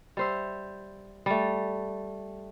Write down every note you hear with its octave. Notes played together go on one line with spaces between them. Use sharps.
G3 C5 E5
G3 A3